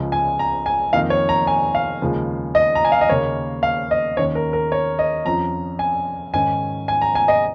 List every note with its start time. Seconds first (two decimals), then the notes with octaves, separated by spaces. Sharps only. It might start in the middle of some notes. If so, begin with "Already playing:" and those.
Already playing: C#2 C#3 F3 G#3
0.12 G#5
0.39 A#5
0.66 G#5
0.93 F2 D#3 A#3 D#4 F5
1.10 C#5
1.29 A#5
1.47 G#5
1.75 F5
2.02 D#2 C#3 F3 G#3
2.55 D#5
2.75 A#5
2.85 G#5
2.92 F5
3.01 D#5
3.09 D#2 C#3 A#3 C#5
3.63 F5
3.91 D#5
4.17 D#2 D#3 C#4 C#5
4.35 A#4
4.53 A#4
4.72 C#5
4.99 D#5
5.25 F2 F3 C#4 A#5
5.79 G#5
6.33 G#2 D#3 C#4 G#5
6.88 G#5
7.01 A#5
7.15 G#5
7.28 D#5